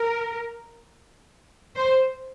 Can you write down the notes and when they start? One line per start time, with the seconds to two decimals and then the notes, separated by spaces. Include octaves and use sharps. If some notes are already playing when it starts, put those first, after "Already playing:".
Already playing: A#4
1.76 C5